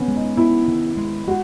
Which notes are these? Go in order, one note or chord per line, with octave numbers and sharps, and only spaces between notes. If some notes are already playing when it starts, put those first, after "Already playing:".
Already playing: D#3 B3 C#4
G#3
D#4
B3 E4
D#3
G#3
G#3 F#4